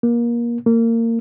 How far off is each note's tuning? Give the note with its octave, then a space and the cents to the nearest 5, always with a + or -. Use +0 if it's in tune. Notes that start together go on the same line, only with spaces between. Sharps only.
A#3 +25
A#3 -25